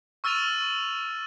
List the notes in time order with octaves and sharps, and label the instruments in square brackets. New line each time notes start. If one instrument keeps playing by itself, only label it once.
[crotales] C#6 E6 F6 A6 D#7 F7